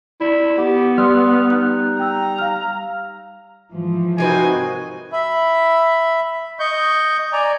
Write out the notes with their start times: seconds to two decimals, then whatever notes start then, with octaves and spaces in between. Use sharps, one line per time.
0.21 E4 D5
0.58 B3 G4 F#5
0.98 G3 C6 D#6 F6 F#6
1.50 D#4 F#6
1.99 G5 A#5 E6
2.38 F5 F6
3.70 G#2 E3 F3
4.18 C3 C4 D#4 F#4 A#4 B4 G#5
5.12 E5 B5
6.60 D#5 C#6 G6
7.33 D5 G#5 A#5